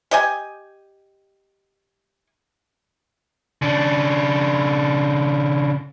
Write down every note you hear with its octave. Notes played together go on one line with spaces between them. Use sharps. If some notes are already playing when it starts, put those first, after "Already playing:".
G4 D#5 G#5
C#3 D4